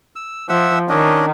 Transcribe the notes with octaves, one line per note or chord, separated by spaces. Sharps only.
E6
F3 E5 F#5 E6
D#3 C#4 D4 D#5